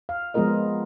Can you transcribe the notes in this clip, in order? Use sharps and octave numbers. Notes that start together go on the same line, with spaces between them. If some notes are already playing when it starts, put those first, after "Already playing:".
F5
F3 G#3 B3 F4 A#4 D#5